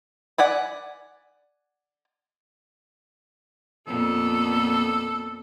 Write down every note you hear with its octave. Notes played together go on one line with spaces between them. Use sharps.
D5 F#5 G#5 B5
F2 A#2 B3 A4